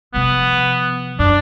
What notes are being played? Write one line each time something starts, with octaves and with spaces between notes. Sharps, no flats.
C3 F3 B3
F#2 D4